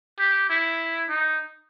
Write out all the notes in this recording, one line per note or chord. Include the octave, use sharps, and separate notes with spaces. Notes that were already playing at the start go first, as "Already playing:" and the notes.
G4
E4
D#4